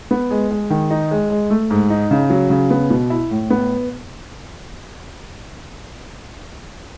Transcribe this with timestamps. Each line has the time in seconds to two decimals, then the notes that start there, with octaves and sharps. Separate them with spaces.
0.11 B3
0.31 G#3
0.51 G#3
0.70 D#3
0.90 D#4
1.11 G#3
1.30 G#3
1.50 A3
1.71 G#2
1.90 D#4
2.11 C#3
2.30 F#3
2.50 C#3
2.70 B3
2.90 B2
3.10 E4
3.31 A2
3.50 B3